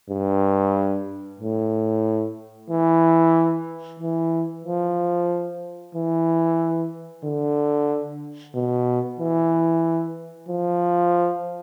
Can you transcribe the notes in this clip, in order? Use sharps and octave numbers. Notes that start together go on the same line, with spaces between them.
G2
A2
E3
E3
F3
E3
D3
B2
E3
F3